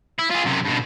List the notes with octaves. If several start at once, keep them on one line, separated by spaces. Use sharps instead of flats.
E4
F4 G#4
F#2 C3
G2 B2